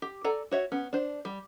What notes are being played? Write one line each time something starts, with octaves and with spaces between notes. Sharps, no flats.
G4
A4 D5 G#5 A#5
F#4 C#5 E5
B3 C#4
D4 C5
G3